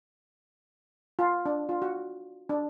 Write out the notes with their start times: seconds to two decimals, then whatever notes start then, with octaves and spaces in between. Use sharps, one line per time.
1.19 F4
1.46 D4
1.69 F4
1.82 F#4
2.49 D4